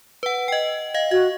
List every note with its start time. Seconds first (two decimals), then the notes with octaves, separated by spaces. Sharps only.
0.23 B4 F#5
0.48 D#5 G5
0.94 D#5 F5
1.11 F#4 D#5